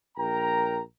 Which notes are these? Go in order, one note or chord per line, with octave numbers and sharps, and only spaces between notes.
A#1 A#4 G5 A#5